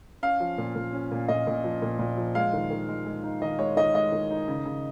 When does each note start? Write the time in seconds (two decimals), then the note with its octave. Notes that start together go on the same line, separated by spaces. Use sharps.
0.23 C#4 F5
0.40 F3
0.58 A#2
0.75 A#2
0.93 C#4
1.11 A#2
1.28 A#2 D#5
1.47 A#2
1.64 F3
1.82 A#2
1.99 A#2
2.17 F3
2.35 G#3 F5
2.53 D#3
2.70 D#3
2.88 G#3
3.06 G#3
3.23 D#4
3.42 D#3 D#5
3.59 G#3 C#5
3.77 D#3 D#5
3.94 G#3 D#5
4.12 D#3
4.31 D#4
4.48 C#3
4.65 C#3